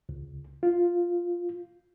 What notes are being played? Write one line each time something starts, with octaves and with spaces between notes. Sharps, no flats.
C#2
F4